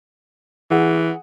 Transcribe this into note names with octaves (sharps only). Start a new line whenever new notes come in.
E3 G#4 F#5